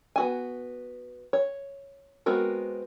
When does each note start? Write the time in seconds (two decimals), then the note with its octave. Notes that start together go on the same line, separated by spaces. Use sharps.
0.16 B3 F#4 G#5
1.33 C#5
2.26 G#3 B3 C4 F#4 A#4